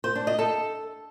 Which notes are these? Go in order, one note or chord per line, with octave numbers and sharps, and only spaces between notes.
C5
D4
D#5
A4